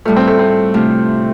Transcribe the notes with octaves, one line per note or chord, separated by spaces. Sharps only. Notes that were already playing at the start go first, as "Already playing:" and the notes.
A2 G3 A3 F4
C4
A3
C4
C3 A3 D4 F4